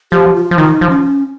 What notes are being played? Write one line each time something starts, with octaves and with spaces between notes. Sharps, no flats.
F3 G4
F4
F3
D#3 D#4
F3
C#4